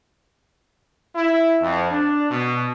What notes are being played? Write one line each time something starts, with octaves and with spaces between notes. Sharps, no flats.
E4
F2
D4
B2